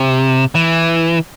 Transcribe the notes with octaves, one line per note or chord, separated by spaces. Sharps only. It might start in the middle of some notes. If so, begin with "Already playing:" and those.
Already playing: C3
E3